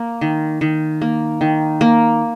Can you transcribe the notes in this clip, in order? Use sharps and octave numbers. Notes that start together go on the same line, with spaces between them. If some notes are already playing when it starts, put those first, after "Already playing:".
Already playing: A#3
D#3
D#3
A#3
D#3
A#3